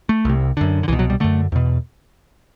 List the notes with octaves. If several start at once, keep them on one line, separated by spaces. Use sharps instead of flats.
A3
C2 C3
F#2 D3
D3
C2 B2 E3
F#3
G3
F#2 D3 A3
E2 B2